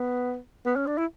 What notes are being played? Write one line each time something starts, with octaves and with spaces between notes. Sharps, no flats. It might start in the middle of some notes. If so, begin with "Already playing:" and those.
Already playing: B3
B3
C#4
D4
E4